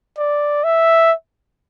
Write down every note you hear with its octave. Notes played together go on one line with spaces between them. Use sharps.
D5
E5